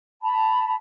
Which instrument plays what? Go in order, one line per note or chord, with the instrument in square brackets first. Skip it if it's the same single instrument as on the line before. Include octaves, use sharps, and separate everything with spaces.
[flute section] A5 B5